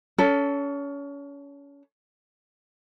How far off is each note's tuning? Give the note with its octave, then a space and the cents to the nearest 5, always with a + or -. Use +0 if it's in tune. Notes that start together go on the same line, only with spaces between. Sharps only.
C#4 +30 A4 +0